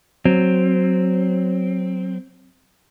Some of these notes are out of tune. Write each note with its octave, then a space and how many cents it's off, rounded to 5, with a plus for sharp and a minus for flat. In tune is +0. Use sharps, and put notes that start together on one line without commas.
F#3 +0 C4 +0